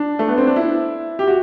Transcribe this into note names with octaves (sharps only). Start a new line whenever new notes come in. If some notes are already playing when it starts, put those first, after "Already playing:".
Already playing: D4
A3
B3
C4
D4
E4
G4
F#4